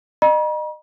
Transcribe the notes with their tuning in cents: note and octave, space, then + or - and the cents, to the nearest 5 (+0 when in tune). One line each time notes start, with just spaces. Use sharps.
D#5 -30 A#5 +45